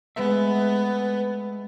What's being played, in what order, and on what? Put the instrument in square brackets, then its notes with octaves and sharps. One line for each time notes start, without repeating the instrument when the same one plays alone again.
[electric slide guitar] G#3 A3 E5 [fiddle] B3